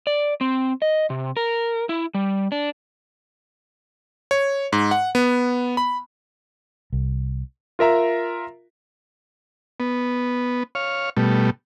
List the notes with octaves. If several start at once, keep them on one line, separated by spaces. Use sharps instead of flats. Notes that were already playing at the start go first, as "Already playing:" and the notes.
D5
C4
D#5
C3
A#4
E4
G3
D4
C#5
G#2
F#5
B3
B5
C2
F4 A#4 E5 A#5
B3
C#5 F5
B2 G3 A3